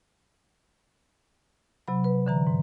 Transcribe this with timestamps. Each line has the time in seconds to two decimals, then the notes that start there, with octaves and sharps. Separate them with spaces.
1.88 C3 F#3 B5
2.04 B4
2.26 D3 E3 A#5
2.47 G#2